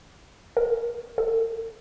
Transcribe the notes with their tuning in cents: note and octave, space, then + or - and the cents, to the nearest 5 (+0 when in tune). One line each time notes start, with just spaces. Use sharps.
A#4 +40
A#4 -40